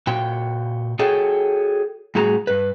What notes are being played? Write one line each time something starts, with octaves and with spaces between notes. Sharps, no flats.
A#2 F#4 G5
F#4 G#4 A4 C#5 G5
A2 G3 F#4 G#4 A#5
G2 B4